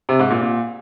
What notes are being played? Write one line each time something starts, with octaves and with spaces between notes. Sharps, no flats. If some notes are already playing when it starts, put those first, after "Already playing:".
C3
G#2
A#2
A#2